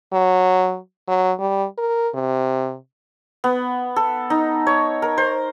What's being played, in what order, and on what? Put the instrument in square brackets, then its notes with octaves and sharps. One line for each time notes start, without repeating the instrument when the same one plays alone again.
[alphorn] F#3
F#3
G3
A#4
C3
[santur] B3
A4
D#4
C#5
A#4
C5